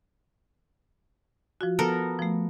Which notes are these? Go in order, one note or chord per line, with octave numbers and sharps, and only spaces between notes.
F3 F4 F#4
B3 A4 A#4
F3 A3